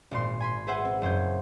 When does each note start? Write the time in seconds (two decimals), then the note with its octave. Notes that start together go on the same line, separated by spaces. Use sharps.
0.11 G#1 A#2 C6
0.40 G#5 B5 C6
0.67 G#4 B4 C5 E5 F#5 G#5
0.85 C4
1.02 F#1 C5 G#5 G6